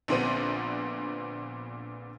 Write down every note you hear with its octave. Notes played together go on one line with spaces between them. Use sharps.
A#1 A#2 D3 B3 C4 D#7